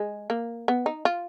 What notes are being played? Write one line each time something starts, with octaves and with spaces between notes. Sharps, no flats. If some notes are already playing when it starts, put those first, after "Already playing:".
Already playing: G#3
A#3
B3
D#4
F4